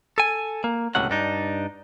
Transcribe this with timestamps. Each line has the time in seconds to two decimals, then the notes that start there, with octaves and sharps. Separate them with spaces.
0.18 A4 G#5
0.64 A#3
0.95 C#2 A2 C3 F#3 C#4 F#5
1.10 G2 D4 D#4